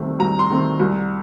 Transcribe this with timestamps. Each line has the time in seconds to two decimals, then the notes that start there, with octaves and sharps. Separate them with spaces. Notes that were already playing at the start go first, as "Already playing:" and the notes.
Already playing: C2 C3 D#3 A3 C4
0.19 C2 A#5
0.39 C6
0.49 C3 D#3 A3 C4
0.79 C2